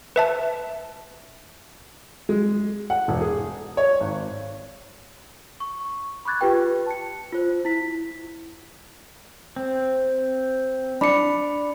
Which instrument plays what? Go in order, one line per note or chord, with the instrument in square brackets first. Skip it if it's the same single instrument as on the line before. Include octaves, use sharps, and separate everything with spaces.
[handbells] B4 E5 A5
[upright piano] G#3
F#5
E1
G#4
C#5
G#1
[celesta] C#6
B5 C#6 D6 F#6 G#6 A6
F4 G4 B4 G5
A5 C#7
F4 C5
E4 B6
[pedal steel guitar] C4
[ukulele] D4 [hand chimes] B5 C#7